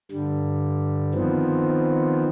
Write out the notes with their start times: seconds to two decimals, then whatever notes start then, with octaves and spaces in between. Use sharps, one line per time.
0.11 G2 D3 G3
1.14 D#3 F3 B3 C4